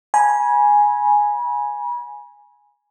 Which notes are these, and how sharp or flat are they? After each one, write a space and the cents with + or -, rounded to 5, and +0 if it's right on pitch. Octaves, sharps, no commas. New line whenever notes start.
G#5 +0 B5 -35